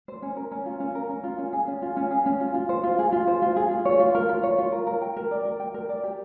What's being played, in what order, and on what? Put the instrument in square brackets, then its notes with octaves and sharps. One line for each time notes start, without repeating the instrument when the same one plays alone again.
[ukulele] C5
C#4
A#4
C#4
F4
C#4
A#4
C#4
F4
C#4
G#4
C#4
F4
C#4
G#4
C#4
F4
F4
C5
F4
G#4
F4
C5
F4
G#4
F4
C#5
F4
A#4
F4
C#5
F4
A#4
A#4
G5
A#4
D5
A#4
G5
A#4
D5
G4